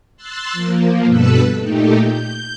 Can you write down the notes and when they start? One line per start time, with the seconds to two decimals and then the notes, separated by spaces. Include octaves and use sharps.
0.17 C6 E6 F#6 A6
0.53 F3 A#3
1.06 G2 B2 A4 B4 E6 F#6
1.60 A#2 A3 D#4 G4
2.03 G6